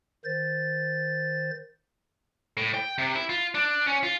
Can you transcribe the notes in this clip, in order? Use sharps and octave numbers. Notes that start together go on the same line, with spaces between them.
D#3 C5 A6
A2
G5
C3
E4
F4
D4
C#4
F4